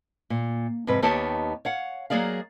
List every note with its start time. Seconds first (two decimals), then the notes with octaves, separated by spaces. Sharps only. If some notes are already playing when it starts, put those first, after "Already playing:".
0.30 A#2
0.87 F2 G#2 C3 B4
1.02 D#2 D#3 B3 G4 C#5 A5
1.65 C#5 F5 F#5
2.10 F#3 A3 A#3 G#4 D5 F5